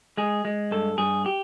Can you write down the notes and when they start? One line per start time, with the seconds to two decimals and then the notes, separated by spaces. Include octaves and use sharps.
0.17 G#3 G#4
0.45 G#3
0.71 G2 A4
0.98 G2 G#4
1.26 G4